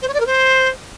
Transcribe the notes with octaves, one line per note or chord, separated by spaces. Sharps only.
C5
C#5
D5
A#4
C5